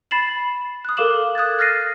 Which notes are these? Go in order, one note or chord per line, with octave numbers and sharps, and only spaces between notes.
B5 A6 C7 E7 F#7
D#6 F#6
A4 A#4 F5 D6 E7 F#7
D#6 F#6 G#6 A6
F6 F#6 A6 A#6 C7 D#7